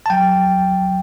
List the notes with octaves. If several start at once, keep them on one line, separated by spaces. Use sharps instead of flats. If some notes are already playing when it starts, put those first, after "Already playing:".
A5
F#3 G5